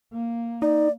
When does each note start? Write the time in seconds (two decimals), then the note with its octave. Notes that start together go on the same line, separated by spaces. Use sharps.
0.13 A#3
0.62 D#4 D5